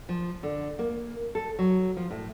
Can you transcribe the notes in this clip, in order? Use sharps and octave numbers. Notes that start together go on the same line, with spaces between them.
F3
D3
A#3
A4
F#3
F3
A2